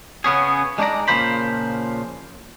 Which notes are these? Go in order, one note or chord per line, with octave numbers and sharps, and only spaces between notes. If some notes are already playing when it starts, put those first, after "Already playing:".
C#3 B3 C#4 G#4
G#3 D4 D#4 D5 A#5
A#2 C#3 F3 A#3 C5 B5